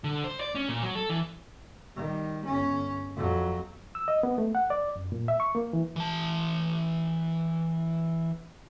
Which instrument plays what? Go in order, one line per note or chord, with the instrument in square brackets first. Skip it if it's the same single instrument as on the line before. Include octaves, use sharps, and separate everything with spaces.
[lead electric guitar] D3
C5
D5
C#4
A#2
F#3
A4
E3
[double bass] D#3 G3
G1 C#4
F2 F#3
[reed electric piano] E6
D#5
B3
A3
F#5
D5
F#2
A#2
E5
C#6
A#3
E3
[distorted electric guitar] E3 A5